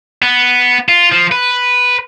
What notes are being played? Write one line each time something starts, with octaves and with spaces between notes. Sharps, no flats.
B3
F4
F3
B4